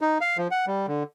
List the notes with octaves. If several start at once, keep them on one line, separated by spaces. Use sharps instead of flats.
D#4
F5
F3
F#5
G3
D3